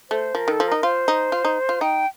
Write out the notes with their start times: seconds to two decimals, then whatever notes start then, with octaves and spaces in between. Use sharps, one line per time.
0.10 A3 C5
0.35 F3 A#4
0.48 D#3 A4
0.60 F3
0.68 D#4 A#4
0.83 F4 C5
1.08 D#4
1.32 F4
1.45 D#4
1.69 F4
1.81 D#4 G5